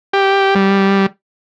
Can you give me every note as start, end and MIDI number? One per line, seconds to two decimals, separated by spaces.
0.13 0.55 67
0.55 1.06 55